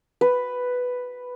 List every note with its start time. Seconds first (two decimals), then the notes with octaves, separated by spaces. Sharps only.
0.21 B4